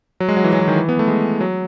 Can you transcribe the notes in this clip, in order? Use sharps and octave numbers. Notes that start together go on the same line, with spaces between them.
F#3
G#3
F#3
E3
F#3
E3
D#3
E3
B3
A3
G#3
F#3